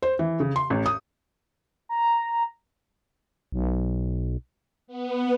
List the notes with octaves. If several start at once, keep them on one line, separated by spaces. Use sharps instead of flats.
C5
E3
C#3
C6
A1
D#6
A#5
B1
B3